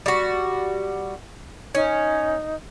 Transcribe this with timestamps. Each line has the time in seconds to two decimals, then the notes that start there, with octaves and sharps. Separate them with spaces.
0.06 G3 F#4
1.75 C#4 D#4